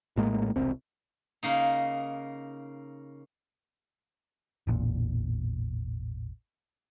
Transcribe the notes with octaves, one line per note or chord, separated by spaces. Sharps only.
A#1 A2 G#3 A#3
E1 C2 C4
C#3 A#3 D#4
E1 A1 A#2